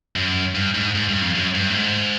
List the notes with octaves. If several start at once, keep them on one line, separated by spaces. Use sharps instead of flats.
F#2
G2
G#2
G#2
G2
F2
F#2
G2
A2
G#2